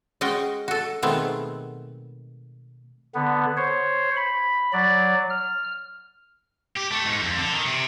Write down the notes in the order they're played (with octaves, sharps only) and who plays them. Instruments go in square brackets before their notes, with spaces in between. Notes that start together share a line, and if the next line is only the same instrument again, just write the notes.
[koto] G#3 C#4 F#4 D#5 G5
F#4 A4
B2 D#3 G#3 A3 B3 C4
[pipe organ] D3 B3
C5 C#5
B5
F#3 D5
F6
[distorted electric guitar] G4
A3
G#2
F2
D3
D#3
C3